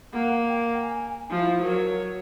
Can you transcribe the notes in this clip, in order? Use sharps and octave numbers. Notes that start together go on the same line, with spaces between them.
A#3 F#5
G5
G#5
F3 E4
F#3 A#4 C#5